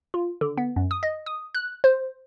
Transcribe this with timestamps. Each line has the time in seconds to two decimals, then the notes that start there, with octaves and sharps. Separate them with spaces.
0.14 F4
0.41 D3
0.58 B3
0.76 F#2
0.91 D#6
1.03 D#5
1.26 D#6
1.55 F#6
1.84 C5